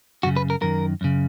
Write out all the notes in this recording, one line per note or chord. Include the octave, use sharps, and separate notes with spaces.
F#2 C#3 F#4
B4
A#4
F#2 D#3 A#4
F#2 C#3